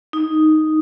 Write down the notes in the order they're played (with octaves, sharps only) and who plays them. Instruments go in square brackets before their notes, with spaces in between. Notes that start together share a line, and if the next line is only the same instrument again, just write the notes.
[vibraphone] D#4